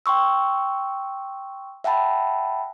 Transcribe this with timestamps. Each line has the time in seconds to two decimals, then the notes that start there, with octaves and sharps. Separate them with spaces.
0.06 G5 C6 C#6 E6
1.84 E5 F#5 G5 A5 B5